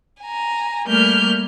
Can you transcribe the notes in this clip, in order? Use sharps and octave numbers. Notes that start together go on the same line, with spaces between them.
G#5 A#5
G3 A3 A#3 F6 G6